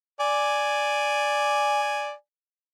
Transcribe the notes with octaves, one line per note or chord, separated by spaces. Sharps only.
D5 G#5